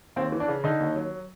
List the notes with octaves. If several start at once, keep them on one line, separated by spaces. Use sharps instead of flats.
D#2 C4
E3
D4
C#3
D3 D#4
D#2
F#3